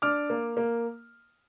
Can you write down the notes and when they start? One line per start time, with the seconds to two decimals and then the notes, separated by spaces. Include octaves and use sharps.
0.02 D4 D6 F6
0.30 A#3
0.57 A#3